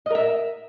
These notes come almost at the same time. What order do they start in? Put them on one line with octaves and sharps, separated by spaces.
D#5 A#4 E5